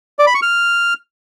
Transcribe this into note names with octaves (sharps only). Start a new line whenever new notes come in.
D5
B5
C#6
F6